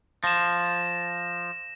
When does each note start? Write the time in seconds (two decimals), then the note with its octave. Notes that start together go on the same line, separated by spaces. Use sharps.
0.24 F3 A#6 E7